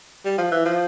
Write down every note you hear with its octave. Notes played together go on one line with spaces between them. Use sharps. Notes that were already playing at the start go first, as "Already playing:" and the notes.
G3
F3
E3
F3